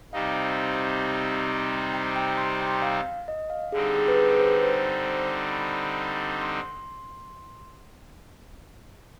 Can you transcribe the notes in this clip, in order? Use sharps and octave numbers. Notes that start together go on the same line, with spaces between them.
C3 G3 C4 D#4 F5
G5
G5
C6
G5
F5
D#5
F5
D3 G3 C4 D#4 G#4
G#4
B4
G#4
B4
C5
C5
B5
C6